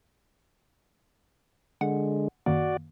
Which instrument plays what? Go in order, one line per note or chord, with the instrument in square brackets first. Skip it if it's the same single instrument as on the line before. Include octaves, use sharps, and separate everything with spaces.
[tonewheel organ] D3 G#3 [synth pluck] F#5
[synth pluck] F#2 D#3 A#3 [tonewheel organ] F#4 D5